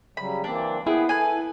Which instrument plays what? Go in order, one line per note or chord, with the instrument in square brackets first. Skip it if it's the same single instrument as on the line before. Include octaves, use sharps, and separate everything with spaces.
[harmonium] C#3 F#3 G3 [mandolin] B5
[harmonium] E3 A#3 C4 [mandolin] D4
[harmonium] B3 B4 G5 [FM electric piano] E4 [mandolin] G#4
[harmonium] A4 [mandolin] B4 G#5